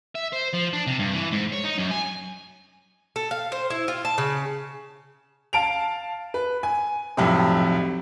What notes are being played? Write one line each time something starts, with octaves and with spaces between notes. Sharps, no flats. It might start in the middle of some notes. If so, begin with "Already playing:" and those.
E5
C5
F3
D4
C3
G2
E3
G#2
C#5
D#4
F#2
G#5
A4
F5
C5
E4
F4
A5
C#3
F5 A5 D7 F7
B4
G#5
B1 F2 A2 C3